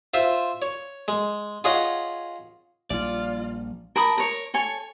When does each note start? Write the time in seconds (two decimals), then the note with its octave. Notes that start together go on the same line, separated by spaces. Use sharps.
0.14 F4 C5 E5
0.62 C#5
1.08 G#3
1.64 F4 G#4 C#5 D#5 F#5
2.90 A#1 G3 F4 D5
3.96 A#4 A5 B5 D#6
4.18 A#4 C#5
4.54 A4 C#5 G#5